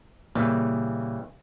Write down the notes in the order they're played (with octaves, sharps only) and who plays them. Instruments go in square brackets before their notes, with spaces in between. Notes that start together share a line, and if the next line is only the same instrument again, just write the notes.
[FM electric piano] A#2 A#3 [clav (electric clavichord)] C#3 E3 G3